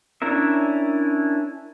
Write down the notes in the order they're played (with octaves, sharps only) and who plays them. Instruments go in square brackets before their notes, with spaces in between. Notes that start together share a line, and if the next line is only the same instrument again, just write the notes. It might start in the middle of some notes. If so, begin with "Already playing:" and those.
[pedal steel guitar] C#4 D4 E4 A#4 E5